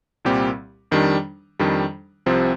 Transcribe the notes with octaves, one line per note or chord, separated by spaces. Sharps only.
C2 A#2 G3 C4 G4
F2 D#3 G3 D4
F2 D#3 G3 D4
C2 C3 F3 C4